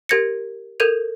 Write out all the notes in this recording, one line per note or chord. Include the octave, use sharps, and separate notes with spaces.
G4 A#4 G#6 A#6 C#7
A4 A#4 G6 G#6 D#7 F7